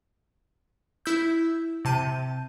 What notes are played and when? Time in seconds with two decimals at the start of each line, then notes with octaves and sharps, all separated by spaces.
1.06 E4 E6 G6
1.85 C3 A5 G6 D#7